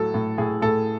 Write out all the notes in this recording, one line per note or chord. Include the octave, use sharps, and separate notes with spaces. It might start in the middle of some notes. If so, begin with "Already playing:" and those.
Already playing: A2 F#3 A4
A2
A2 G#4
A2 A4